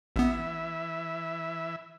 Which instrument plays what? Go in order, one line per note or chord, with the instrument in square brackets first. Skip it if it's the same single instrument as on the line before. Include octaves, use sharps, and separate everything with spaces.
[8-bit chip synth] A1 B3 [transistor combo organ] E3 E5